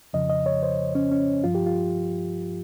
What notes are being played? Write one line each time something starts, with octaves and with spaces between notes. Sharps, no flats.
F2 C#3 F3 D#5
D#5
C#5
C5
C#4
C#4
G2 F3 F4
G4
F4